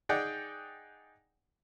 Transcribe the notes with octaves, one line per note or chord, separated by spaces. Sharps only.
D#4 G#4 D5 F#5 G5